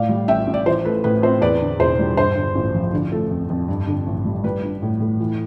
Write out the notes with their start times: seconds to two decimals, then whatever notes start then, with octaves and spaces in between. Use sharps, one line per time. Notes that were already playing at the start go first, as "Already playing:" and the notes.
Already playing: A2 D5 F5
0.09 G3
0.28 A1 E5 G5
0.47 A1
0.54 D5
0.65 E3 C5
0.85 A3 B4
1.04 A2 B4
1.22 C4 C5
1.41 E2 B4 D5
1.61 D3
1.79 E1 C5
1.99 G3
2.17 G2 C5
2.36 D3
2.55 A1
2.74 F3
2.94 D3
3.12 A3
3.31 F2
3.50 F2
3.68 G2
3.87 D3
4.07 A1
4.25 G3
4.44 G3 B4
4.63 D4
4.82 A2
5.01 A2
5.20 E3